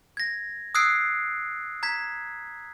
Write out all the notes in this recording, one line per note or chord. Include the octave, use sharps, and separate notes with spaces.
G#6 A#6
D#6 E6 F#6 G#6 C7 D7
A#5 G#6 B6